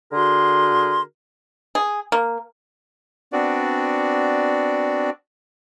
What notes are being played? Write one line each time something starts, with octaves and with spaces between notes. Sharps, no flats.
D3 F#4 G#4 A#4 C6
G#4
A#3
B3 C4 D4 F#4 D5